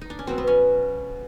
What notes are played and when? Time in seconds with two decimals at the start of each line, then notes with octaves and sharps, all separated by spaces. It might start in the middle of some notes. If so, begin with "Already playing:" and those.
0.01 D#4
0.10 D4
0.19 C#4
0.27 B2 F#3 B3 C4
0.38 B3
0.47 C#4